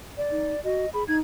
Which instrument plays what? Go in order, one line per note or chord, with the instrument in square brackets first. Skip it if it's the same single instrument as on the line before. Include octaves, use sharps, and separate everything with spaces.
[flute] D5
[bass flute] D#4
[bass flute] F#4 [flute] D#5
[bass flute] G#4 [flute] B5
[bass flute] D#4 [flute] G#6